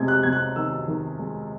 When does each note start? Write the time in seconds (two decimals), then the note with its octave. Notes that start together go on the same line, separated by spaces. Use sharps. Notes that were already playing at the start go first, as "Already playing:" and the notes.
Already playing: C3 G#3 G#6
0.08 F#6
0.23 C3 G#6
0.33 F#6
0.56 D#3 E6
0.88 D#3
1.19 G#3